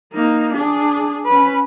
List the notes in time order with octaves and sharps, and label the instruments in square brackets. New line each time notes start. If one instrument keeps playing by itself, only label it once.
[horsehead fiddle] A#3 D#4
D4 G#4
C#4 B4